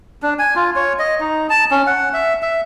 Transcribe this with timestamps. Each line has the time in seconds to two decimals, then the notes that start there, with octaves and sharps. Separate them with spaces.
0.22 D4
0.39 G#5
0.56 F4
0.76 C#5
0.99 D#5
1.20 D#4
1.50 A5
1.71 C#4
1.87 F#5
2.14 E5
2.42 E5